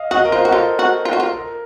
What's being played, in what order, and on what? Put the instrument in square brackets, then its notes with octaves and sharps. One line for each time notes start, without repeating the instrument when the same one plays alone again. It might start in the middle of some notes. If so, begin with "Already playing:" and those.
Already playing: [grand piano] D#5 F5
[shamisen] F#4 [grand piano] D#5
[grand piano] A#4
[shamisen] F4 [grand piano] C5
[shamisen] F#4
[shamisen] F4 [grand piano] A4
[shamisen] F#4
F4
F#4
F4
[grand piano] A#4